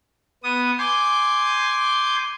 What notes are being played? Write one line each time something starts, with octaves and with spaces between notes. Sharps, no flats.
B3 D#6
G#5 C6 D6 G6